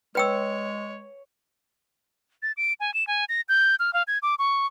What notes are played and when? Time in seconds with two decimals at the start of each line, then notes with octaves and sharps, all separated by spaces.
0.15 G#3 B4 C#5 G5 E6
2.43 A6
2.57 D7
2.80 G#5
2.94 E7
3.07 G#5
3.29 A#6
3.49 G6
3.79 F6
3.93 F5
4.08 G#6
4.22 D6
4.39 C#6